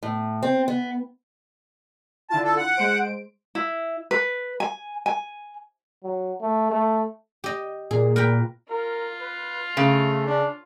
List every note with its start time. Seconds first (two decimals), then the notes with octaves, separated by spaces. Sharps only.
0.03 A2
0.43 C4
0.68 B3
2.30 D3 E4 F4 A5
2.44 A4
2.57 F#5
2.75 G#3 C5 D7
3.55 E4
4.11 B4
4.60 G#5
5.06 G#5
6.04 F#3
6.41 A3
6.71 A3
7.44 G4 D#5
7.91 A#2 G#4
8.16 A#4 B4 G5
8.70 F4 A#4
9.21 B4
9.77 C#3 A3
10.26 D4